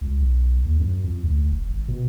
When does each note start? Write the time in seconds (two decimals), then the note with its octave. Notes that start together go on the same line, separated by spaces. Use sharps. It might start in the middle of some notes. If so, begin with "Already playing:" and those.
0.01 C#2
0.20 B1
0.65 D#2
0.79 F#2
1.04 F2
1.24 D2
1.51 F1
1.69 G#1
1.88 B2